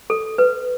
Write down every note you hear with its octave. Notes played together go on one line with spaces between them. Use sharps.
A4
B4